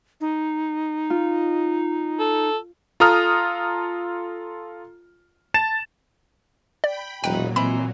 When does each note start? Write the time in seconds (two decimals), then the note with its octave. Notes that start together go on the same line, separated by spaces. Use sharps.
0.21 D#4
1.10 F4
2.19 A4
3.00 F4 A4 A#5 D#6 F6
5.54 A5 A6 E7
6.84 D5 G5 B5
7.24 E1 A#2 F#3 D#4 B4 G5
7.56 E3 C4 D#4 C5 B5